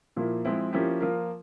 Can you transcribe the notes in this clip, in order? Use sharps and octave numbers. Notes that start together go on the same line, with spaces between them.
A#2 F3 A#3 E4
F3 G#3 C4 E4
F3 A#3 C#4 E4 G4
F3 A#3 F4 A#4